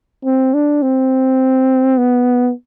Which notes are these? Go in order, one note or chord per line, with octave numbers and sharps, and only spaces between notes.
C4
D4
C4
B3